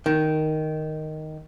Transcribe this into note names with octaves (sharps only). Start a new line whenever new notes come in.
D#3